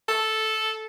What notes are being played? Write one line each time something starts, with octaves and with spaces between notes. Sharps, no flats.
A4